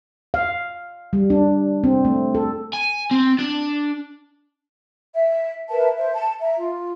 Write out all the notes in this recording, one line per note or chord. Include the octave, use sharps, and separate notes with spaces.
F5
G3
D4
C4
A3
A4
G#5
C4
D4
E5
A#4 B4 E5 A5
C5 E5
A5
E5 A#5
F4